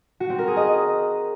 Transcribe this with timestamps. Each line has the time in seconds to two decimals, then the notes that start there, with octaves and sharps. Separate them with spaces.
0.20 F#4
0.29 C4
0.39 A#4
0.48 G#4
0.57 D#5